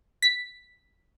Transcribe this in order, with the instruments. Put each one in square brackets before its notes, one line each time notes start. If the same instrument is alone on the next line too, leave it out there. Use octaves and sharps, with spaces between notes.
[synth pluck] B6